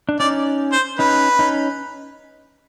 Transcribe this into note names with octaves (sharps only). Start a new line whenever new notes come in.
D4
C#4 D#4 D5
C5
C#4 D#4 B4
C#4 D#4